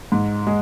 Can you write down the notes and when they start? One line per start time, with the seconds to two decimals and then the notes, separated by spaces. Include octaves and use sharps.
0.12 G#2
0.47 G#3